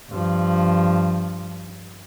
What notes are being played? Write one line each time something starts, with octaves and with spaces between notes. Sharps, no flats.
G2 F3